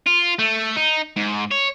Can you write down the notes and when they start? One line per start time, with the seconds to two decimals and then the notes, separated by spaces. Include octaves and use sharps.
0.07 F4
0.39 A3
0.76 D#4
1.16 G#2
1.51 C#5